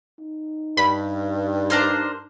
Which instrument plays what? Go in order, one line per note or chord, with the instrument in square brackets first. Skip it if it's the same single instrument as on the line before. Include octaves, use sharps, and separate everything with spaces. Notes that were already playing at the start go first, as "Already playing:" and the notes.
[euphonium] D#4
[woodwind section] G2 [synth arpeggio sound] B5
[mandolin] D4 A#4 C5